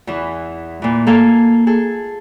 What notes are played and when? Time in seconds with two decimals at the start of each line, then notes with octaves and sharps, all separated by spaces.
0.07 E2 E3
0.82 A#2 E3
1.07 A#3 A4 F5 G#5
1.67 G#4 A4